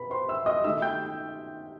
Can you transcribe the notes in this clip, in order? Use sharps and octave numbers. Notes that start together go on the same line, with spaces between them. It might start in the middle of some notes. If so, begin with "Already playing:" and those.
Already playing: B2 B4 B5
C5 C6
E5 E6
D#5 D#6
D#3 A3 D#4 E5 E6
G5 G6